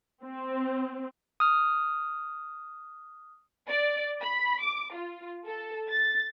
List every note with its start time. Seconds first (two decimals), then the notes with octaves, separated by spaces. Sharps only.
0.23 C4
1.40 D#6 F6
3.68 D5
4.21 B5
4.61 D6
4.94 F4
5.46 A4
5.88 A6